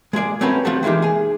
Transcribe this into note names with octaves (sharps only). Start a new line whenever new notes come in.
G#3 A#3 G#4 D5
A3 C4 C#4 F#4 A#4 B4
F3 A3 C4 F#4 G4 A4
E3 G#3 A#3 D#4 G4
G#4 G#5